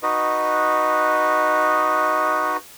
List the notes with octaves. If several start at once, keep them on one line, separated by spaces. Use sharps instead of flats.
D#4 F#4 B4 D#5